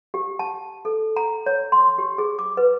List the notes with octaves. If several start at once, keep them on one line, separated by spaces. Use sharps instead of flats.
G4
A5
A4
A#5
C#5
C6
G4
G#4
D6
B4